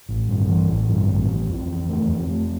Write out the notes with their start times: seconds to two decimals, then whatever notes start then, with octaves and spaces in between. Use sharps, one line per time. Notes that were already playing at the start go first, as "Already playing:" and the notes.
0.09 A1
0.28 G2
0.49 E3
0.69 A1
0.89 G2
1.09 A1
1.29 E3
1.49 F2
1.69 E3
1.89 A3
2.09 F2
2.30 A3